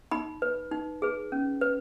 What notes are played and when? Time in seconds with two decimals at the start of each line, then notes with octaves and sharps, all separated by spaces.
0.11 D#4 B5
0.42 B4
0.72 D#4
1.02 G#4 B4
1.32 C#4
1.61 B4